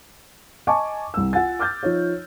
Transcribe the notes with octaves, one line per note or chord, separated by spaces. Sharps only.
D#5 G#5 A5 C#6 D6
C2 E6
F4 F#5 G#5 A6
D6 F6 G6 A6
F3 D#4 C#5